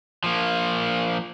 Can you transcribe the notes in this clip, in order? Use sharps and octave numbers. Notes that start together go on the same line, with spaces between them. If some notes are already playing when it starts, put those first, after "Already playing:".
F3 A#3